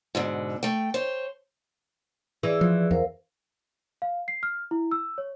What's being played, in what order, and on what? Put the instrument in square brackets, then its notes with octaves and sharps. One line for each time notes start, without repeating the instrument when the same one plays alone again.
[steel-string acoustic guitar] G#2 B2 D3
A3 G5
C5 C#5
[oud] E3 [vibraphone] G#4 D5
[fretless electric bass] F3
[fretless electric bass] E2 [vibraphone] A#4 C5 F5
[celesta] F5
C7
F6
E4
E6
C#5